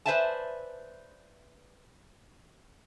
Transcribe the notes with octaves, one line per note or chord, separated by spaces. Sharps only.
B4 C5 D5 E5 G#5 A5